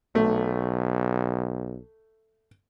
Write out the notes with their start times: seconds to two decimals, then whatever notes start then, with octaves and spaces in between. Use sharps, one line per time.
0.15 B1 A3